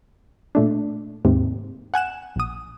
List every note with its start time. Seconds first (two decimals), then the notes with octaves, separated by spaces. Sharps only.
0.55 A#2 A3 D4
1.25 D#2 G#2 C3
1.94 F#5 G#5 F#6 E7
2.36 A#1 D#6